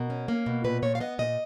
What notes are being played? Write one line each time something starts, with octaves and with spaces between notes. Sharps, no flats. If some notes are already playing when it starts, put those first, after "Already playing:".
Already playing: B2 A#4
C#4
A#3
B2
A#2 B4
A#2 C#5
F5
B3 D#5
A#2 D#5